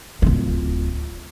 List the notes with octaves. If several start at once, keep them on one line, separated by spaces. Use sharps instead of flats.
D1 F4